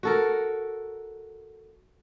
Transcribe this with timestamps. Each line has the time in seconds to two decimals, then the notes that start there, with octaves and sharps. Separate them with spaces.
0.03 F#4 A4 A#4